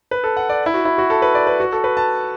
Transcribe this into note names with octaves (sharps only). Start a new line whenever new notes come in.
B4
A4
F#5
D5
E4
F#4
E4
F#4
A4
B4
D5
B4
F#4
A4
B4
A5